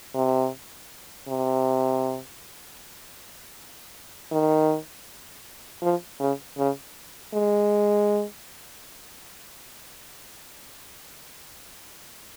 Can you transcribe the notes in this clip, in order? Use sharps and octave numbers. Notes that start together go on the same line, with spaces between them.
C3
C3
D#3
F3
C#3
C#3
G#3